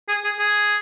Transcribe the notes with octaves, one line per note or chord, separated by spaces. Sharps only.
G#4
G#4
G#4